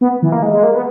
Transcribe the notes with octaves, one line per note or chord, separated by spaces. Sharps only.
B3
E3
A#3
G#3
G#3
A#3
B3